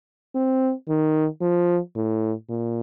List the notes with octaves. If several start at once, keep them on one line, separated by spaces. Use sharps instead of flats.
C4
D#3
F3
A2
A#2